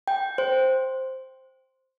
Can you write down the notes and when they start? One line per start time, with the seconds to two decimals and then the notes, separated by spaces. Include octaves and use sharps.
0.08 G5
0.38 C5